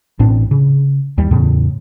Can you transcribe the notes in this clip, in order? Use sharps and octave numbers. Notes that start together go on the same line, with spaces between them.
A1 A2 C4 D4
C#3
D#2 G3
E2 A2 C#3